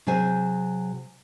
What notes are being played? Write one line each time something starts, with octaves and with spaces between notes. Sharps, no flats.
C3 F#3 G#4 C5 G#5